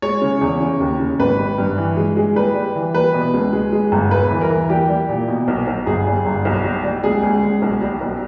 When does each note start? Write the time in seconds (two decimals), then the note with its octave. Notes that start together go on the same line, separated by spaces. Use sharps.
0.02 G#3 C#5
0.22 C#3
0.41 E2
0.61 C#3
0.80 D#2
1.00 C#3
1.19 G#1 B4
1.39 G3
1.58 G2
1.78 E3
1.97 G#3
2.17 G#3
2.36 G3 B4
2.55 G3
2.75 E3
2.94 G3 B4
3.14 B2
3.34 C#2
3.53 G#3
3.73 G#3
3.92 G1
4.11 E1 B4
4.31 E3
4.41 A#4
4.50 E3
4.70 G3 G4
4.90 G3
5.09 A#2
5.28 B2
5.48 B1
5.67 B1
5.86 G1 G#4
6.06 G3
6.26 G1
6.45 B1
6.65 G3
6.84 G3
7.04 C#2 G#4
7.23 C#2
7.42 C#2
7.62 B1
7.82 G3
8.01 B1